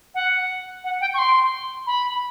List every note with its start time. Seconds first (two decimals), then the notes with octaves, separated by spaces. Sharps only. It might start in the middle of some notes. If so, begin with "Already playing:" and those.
0.14 F#5
0.84 F#5
1.01 G5
1.13 C#6
1.18 C6
1.86 B5